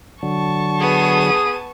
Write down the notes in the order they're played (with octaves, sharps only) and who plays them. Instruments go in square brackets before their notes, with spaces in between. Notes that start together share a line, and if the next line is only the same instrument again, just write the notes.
[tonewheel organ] D3 F#3 [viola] A5 C#6
[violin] B3 D#7 [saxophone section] G#4